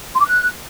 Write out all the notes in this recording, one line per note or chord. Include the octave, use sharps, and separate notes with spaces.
C6
D6
F#6